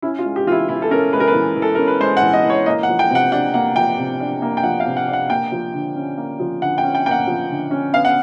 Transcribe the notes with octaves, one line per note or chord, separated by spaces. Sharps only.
C#4 E4
F4
G#3
G4
E3 F4
E4
E3 E4
A4
C#4 A#4
G#3 B4
A#4
B4
E3
E3
A4
C#4 A#4
B4
G#3 C5
F#5
E3
D#5
E3
C#5
A#3 D#5
F#5
F3
G5
C3 F#5
D4 F#5
A#3 F#5
F3 G5
C3
D4
A#3
G5
F3 F#5
F5
C3
F#5
D4
F#5
A#3 G5
F3
D3
C#4
A#3
F3
D3 F#5
G5
C#4
G5
A#3 G5
F#5
F3
D3
C#4
B3 F5
F#5